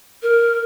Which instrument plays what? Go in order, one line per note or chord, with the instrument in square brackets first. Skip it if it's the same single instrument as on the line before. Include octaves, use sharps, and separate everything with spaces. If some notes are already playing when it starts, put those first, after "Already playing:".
[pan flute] A#4